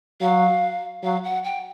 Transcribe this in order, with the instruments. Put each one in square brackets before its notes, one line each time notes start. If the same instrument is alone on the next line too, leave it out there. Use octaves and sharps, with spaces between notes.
[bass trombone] F#3 [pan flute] F5
[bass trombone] F#3 [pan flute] F5
[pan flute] F#5
G5